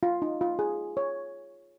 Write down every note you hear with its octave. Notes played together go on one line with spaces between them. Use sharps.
F4
D#4
F4
G#4
C#5